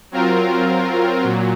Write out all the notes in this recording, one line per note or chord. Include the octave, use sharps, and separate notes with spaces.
F#3 C4 F4 A#4
A#2 F#3